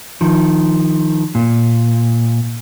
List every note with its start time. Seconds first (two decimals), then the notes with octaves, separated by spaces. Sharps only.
0.21 D#3 F3
1.35 A#2